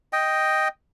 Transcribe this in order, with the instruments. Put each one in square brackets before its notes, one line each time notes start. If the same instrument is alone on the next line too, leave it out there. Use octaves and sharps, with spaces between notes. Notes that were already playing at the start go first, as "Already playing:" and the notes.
[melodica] D#5 G5